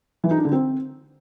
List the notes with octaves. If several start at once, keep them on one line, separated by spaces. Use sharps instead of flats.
E3
D#4
D4
D3
C4